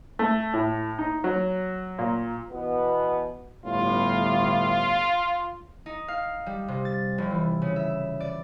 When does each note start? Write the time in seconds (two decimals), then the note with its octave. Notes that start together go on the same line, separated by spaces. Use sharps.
0.19 A3
0.54 A2
0.99 D#4
1.24 F#3
1.99 A#2
2.51 B2 E3 B3
3.66 G1 A2 F4
5.86 D#4
6.08 F5
6.46 G3
6.68 C3
6.85 A6
7.18 F1
7.31 E3
7.62 C#3
7.76 E5
8.20 D5